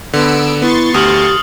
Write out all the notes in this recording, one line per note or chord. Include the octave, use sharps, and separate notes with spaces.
D3 B3 E6 D7
B3 E4 C6 C#6 A6
D2 G4 D#6 F6 F#7